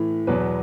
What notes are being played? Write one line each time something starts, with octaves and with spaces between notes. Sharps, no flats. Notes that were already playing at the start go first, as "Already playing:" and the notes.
Already playing: A2 E3
E2 B2 F#3 B4